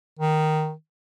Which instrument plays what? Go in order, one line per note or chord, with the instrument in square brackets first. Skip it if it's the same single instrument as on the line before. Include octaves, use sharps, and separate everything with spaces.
[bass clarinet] D#3